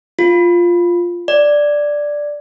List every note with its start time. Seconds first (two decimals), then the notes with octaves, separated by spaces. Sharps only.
0.19 F4
1.28 D5